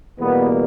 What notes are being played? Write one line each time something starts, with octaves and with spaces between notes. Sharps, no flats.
E2 B2 G3 A#3 B3